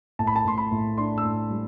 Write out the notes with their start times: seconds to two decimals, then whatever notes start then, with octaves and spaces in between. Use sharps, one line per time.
0.19 A2 A5
0.27 B5
0.36 A5
0.45 A2 C6
0.58 B5
0.71 A2
0.97 D4 C6
1.18 E6
1.24 A2
1.50 G3